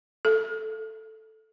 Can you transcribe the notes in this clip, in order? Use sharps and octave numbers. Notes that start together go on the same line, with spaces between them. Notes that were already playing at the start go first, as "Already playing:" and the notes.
A4